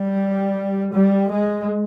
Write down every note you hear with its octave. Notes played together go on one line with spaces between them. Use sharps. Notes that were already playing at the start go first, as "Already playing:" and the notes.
Already playing: G3
G3
G#3